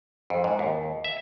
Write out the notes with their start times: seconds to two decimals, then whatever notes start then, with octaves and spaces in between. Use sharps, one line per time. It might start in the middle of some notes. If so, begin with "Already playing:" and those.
0.30 F2
0.44 G#2
0.59 D#2
1.04 E5